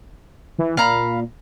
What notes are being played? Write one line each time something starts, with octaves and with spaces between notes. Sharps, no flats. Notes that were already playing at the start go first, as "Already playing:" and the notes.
E3
A#2 F5 A#5 B5